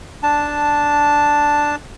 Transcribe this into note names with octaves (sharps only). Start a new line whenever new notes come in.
D4 A5